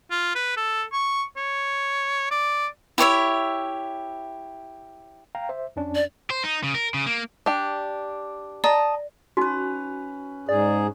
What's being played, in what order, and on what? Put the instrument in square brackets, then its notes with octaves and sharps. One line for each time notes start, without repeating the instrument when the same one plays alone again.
[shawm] F4
B4
A4
C#6
C#5
D5
[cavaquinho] E4 G4 C#5 E5
[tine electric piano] F5 G5 A#5
C5 E5
F2 C#4 D4
[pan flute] D5
[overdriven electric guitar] C5
D#4
C#3
A#4
C#3
A#3
[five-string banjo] D4 G4
[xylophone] D5 [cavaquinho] D#5 A5 A#5
[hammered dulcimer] C#4 B4 [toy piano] D#4 F#4
[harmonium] G#2 G#4 [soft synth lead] D5